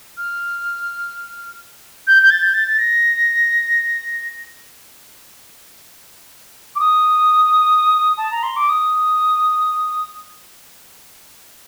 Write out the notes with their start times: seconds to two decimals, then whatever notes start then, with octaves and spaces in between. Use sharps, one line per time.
0.17 F6
2.07 G6
2.22 G6
2.30 A6
2.43 G6
2.54 A6
2.68 A6
2.78 A#6
6.75 D6
6.79 D#6
8.17 A5
8.31 A#5
8.43 C6
8.56 D6
8.69 D#6